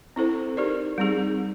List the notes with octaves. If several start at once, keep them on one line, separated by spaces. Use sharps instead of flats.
C4 E4 A4 C5
D#4 G4 A#4 D5
G3 C4 D#4 G#4